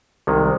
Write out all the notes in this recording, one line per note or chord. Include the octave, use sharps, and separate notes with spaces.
C2 C3 D#3 G#3